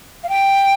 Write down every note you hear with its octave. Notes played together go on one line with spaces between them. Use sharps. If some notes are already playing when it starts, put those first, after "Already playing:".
F5
G5